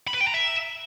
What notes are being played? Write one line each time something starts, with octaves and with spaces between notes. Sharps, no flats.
B5
B4
G5
A#5
E5